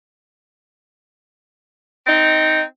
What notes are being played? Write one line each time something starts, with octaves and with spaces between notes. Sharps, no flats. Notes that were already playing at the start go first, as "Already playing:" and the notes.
C4 D#4